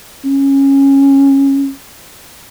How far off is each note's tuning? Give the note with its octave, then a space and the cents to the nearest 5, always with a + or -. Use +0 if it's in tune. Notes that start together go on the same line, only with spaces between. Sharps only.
C#4 -15